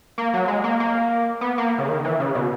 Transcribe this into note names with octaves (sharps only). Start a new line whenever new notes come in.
A#3
F#3
G#3
A#3
A#3
B3
A#3
C#3
D#3
E3
C#3
B2